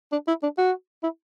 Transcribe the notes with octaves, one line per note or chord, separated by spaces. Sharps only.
D4
E4
D4
F#4
E4